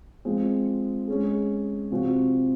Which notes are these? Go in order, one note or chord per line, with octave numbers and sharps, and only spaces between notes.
F3 G#3 C4
G#3 C#4 G#4
C3 F3 C4 F#4